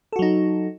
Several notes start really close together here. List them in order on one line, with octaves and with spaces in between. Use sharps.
A4 F#4 F#3 D#4